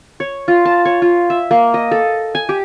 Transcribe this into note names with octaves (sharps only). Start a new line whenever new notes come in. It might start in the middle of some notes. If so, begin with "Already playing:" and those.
C#5
F4
A5
C#5
F4
E5
A#3
D#5
A4
G#5
G4